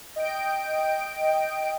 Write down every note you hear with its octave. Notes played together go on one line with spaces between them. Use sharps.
D#5 G5 D7